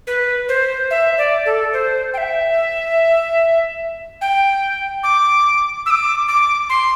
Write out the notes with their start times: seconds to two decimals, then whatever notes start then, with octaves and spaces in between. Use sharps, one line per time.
0.07 B4
0.49 C5
0.91 E5
1.18 D5
1.46 A4
1.73 C5
2.14 G5
2.18 E5
4.21 G5
5.03 D6
5.86 E6
5.90 D6
6.28 D6
6.69 C6